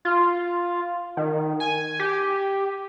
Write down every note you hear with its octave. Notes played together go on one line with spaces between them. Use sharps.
F4
D#3
G#5
G4